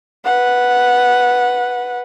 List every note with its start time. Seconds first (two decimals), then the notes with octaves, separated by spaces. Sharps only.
0.25 B4 F#5